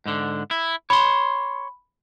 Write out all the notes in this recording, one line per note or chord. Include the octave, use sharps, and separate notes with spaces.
G#2 D3
E4
C#5 B5 C6